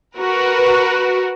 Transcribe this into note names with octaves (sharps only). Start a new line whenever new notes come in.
F#4 A#4 B4